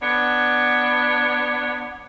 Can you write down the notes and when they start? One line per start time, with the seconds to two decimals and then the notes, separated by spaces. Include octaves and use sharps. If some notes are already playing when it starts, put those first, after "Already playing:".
0.01 B3 D4 C#5